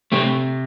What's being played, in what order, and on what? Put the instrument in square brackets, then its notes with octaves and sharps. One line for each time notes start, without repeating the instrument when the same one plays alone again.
[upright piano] C3 [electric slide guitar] A3 C4